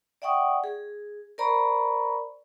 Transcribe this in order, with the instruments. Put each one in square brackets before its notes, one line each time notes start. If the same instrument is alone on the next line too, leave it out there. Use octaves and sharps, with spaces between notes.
[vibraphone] D5 E5 F#5 G5 C#6 D#6
G#4
A#4 C5 D5 A#5 B5 C#6